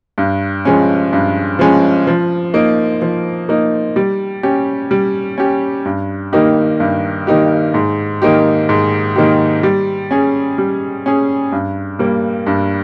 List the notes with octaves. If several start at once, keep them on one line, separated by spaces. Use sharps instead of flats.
G2
F3 G#3 C#4
G2
F3 G#3 C#4
F3
A#3 D#4
F3
A#3 D#4
G3
C#4 G4
G3
C#4 G4
G2
D#3 A#3 D#4 G4
G2
D#3 A#3 D#4 G4
G#2
D#3 A#3 D#4 G4
G#2
D#3 A#3 D#4 G4
G3
C#4 G#4
G3
C#4 G#4
G2
G3 A#3
G2